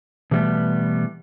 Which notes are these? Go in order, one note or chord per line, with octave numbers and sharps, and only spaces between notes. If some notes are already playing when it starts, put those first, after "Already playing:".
B2 E3 G3 A3 B3